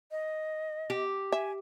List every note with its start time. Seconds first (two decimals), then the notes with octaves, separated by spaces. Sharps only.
0.11 D#5
0.90 G4
1.32 E5 G#5